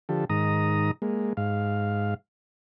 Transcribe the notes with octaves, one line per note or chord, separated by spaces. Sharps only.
D3 F3 G4 A4
G#2 D#3 A#5 D#6
G#3 A#3
G#2 F5